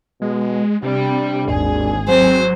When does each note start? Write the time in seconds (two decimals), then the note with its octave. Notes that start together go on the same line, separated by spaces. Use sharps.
0.22 B2 G#3
0.83 C3 G3 D4
1.48 G#1 D#2 G#4
2.08 F#3 C4 C5